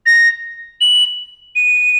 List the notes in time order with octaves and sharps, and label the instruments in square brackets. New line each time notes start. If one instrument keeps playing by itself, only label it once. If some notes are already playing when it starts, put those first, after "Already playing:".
[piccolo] A#6
F#7
D#7